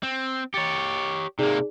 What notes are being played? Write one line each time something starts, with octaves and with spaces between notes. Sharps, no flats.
C4
G4 C#5 A6 C#7
C3 A#3 D#4 G#4 D5